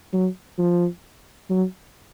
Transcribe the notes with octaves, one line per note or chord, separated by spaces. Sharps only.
F#3
F3
F#3